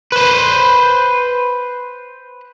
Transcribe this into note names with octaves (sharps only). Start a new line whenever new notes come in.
B4 C5